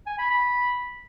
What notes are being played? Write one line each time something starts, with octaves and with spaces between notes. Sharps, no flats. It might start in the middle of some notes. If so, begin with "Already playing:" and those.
G#5
B5
B5